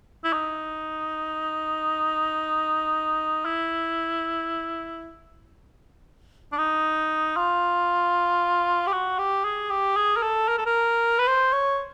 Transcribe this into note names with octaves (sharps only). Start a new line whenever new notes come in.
E4
D#4
E4
D4
D#4
F4
G4
F#4
G4
G#4
G4
G#4
A#4
A4
A#4
A4
A#4
B4
C5
C#5